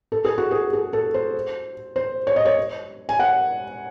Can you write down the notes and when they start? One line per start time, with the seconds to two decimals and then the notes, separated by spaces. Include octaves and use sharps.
0.12 A4
0.25 G#4
0.38 F#4
0.51 G#4
0.73 G#4
0.93 A4
1.14 C5
1.96 C5
2.27 C#5
2.36 D#5
2.45 C#5
3.09 G#5
3.20 F#5